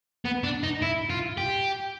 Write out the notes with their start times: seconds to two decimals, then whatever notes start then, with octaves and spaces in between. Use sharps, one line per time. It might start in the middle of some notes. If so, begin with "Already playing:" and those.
0.25 B3
0.43 D4
0.63 D#4
0.82 E4
1.10 F4
1.37 G4